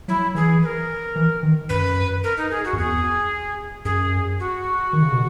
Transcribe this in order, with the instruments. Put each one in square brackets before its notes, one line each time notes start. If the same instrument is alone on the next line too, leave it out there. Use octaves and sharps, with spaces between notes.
[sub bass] F#3 [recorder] E4
[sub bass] E3 [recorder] G#4
[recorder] B4
A#4
[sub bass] E3
D#3
[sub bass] F#2 [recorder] B4
[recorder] A#4
D#4
G#4
F#4
[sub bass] F#2
[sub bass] E2 [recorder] G#4
[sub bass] F#2 [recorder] G#4
[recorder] F#4
[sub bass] D#3
C#3
B2